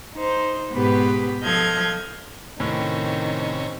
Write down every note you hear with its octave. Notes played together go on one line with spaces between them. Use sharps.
D#4 C5
G#2 B2 B3 G4 B4 B5
F3 A4 D#5 F6 G6 G#6
A2 C3 D#3 C#4